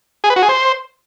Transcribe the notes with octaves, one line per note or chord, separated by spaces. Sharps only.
G#4
B4
F#4
G#4
C5